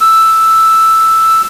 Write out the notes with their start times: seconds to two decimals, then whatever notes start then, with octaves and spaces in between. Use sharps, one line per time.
0.01 E6